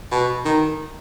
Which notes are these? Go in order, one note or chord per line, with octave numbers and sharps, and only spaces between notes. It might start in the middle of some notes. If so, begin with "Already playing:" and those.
B2
D#3